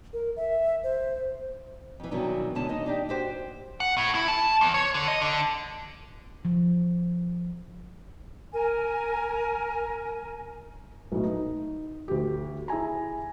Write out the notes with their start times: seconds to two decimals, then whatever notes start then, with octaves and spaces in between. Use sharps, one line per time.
0.13 A#4
0.36 E5
0.84 C5
2.00 F2 E3
2.11 G2 B2 D#3 E3 F#3
2.55 G#2 B2 D3 C#4 A5
2.69 D#2 D#4 D#5
2.86 D4 D#4 G4
3.09 F#4 G4 C5
3.80 F#5
3.97 A2
4.15 E4
4.28 A5
4.61 E2
4.74 C#5
4.94 D3
5.08 D#5
5.22 D3
6.45 F3
8.52 A#4 G#5
11.12 B1 A2
11.23 D#4
12.08 D2 G4
12.68 E4 G#4 G#5 A#5